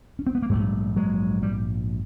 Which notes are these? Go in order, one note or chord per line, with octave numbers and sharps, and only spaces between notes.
C#4
C4
B3
A#3
A#1 G#2 G3 A3
F#3 G#3
G3